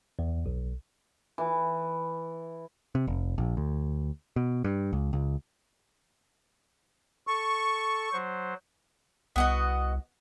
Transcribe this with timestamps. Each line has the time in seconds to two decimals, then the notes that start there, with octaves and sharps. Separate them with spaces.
0.19 E2
0.46 B1
1.38 E3
2.95 C3
3.07 F1
3.38 A#1
3.57 D2
4.36 B2
4.64 G2
4.93 C#2
5.13 C#2
7.27 A4 C#6
8.12 F#3 C5
9.36 C2 B3 F#4 D#5